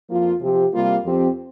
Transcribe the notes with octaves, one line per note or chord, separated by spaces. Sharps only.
F2 F3 A#3 F4
C3 F3 C4 G4
C3 G3 A#3 F4
F2 F3 C4 G4